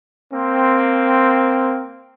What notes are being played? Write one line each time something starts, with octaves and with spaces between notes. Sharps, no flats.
A#3 C4